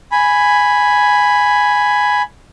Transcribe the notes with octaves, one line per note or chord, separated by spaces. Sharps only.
G#5 B5